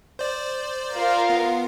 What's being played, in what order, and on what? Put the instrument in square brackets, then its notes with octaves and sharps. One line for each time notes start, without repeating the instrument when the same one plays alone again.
[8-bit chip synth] C5 D5
[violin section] F4 A#4 F5
[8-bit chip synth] B3